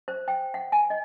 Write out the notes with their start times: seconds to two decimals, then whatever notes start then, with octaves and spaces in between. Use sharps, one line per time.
0.08 C5
0.28 G5
0.54 F#5
0.72 G#5
0.90 D#5